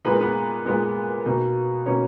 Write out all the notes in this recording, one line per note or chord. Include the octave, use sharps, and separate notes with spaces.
A#2 G#3 B3 D#4 B4
A#4
B3 B4
A#2 G#3 B3 D#4
B2 A#3 D#4
B2 A#3 C#4 D#4 C#5